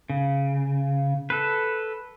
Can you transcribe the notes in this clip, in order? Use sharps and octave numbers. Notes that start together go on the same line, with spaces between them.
C#3
A4 B4